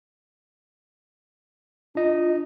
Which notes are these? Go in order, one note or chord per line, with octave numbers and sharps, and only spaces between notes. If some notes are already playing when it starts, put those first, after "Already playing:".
D4 F4 D#5